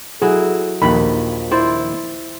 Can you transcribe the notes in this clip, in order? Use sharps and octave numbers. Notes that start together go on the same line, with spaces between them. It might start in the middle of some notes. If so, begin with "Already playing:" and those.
F#3 E4 G#4 A4
A#1 D#2 D#3 F3 B5
E4 C5 D5